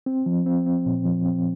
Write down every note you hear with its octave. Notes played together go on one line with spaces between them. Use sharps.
C4
F3
C4
C4
A#2
F3
C4